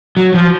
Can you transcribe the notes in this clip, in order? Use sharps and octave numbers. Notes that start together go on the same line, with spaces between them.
F#3
F3